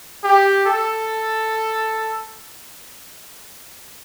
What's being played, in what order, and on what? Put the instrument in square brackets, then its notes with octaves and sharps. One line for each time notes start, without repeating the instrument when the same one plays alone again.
[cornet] G4
A4